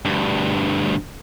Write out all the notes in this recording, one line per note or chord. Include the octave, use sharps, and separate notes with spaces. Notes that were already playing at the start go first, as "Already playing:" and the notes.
D2 G2